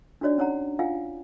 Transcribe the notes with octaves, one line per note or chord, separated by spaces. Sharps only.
D4 D#4 F#4 C#5 D5
C#4 D#4 C#5 F#5 A#5
F4 F5 F#5 G#5